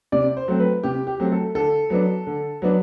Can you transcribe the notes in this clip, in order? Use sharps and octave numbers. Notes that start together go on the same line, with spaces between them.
C3 D5
C5
F#3 A3 C4
B4
C3 G4
G4
F#3 A3 C4
A4
D3 A4
F#3 B3 D4
D3
F#3 B3 D4